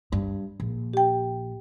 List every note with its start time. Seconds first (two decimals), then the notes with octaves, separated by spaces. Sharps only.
0.12 G2
0.60 A#1
0.94 G4 G5